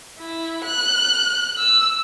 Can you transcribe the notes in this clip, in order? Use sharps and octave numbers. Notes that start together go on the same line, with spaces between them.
E4
F#6
E6